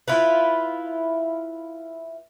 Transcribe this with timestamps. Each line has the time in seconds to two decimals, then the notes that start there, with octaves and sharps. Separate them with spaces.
0.08 E4 F4 B4